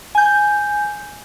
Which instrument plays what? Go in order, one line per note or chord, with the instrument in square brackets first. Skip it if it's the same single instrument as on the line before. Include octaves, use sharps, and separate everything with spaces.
[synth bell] G#5 G6